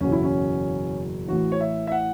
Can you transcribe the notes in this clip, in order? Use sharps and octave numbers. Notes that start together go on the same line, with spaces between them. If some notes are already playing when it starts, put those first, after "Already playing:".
F#1 E2 B2 C#4
E4
C#4
A1 A2 E3 F#4
C#5
E5
E5
F#5